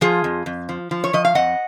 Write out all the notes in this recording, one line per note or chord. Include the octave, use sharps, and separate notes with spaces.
F3 F4 G#4
F2
F2
F3
F3
C#5
F3 D#5
F5
F2 D#5 F#5